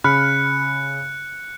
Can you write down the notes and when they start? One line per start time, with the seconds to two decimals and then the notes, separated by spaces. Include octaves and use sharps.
0.04 C#3 B5 F6 F#6 C#7